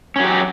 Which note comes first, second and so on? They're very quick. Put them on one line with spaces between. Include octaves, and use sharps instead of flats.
C#4 F#3 G4